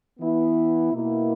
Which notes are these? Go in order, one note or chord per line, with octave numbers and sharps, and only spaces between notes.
E3 B3 E4
B2 A#3 E4